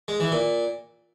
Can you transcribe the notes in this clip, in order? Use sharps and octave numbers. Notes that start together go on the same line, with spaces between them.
G#3
E3
A#2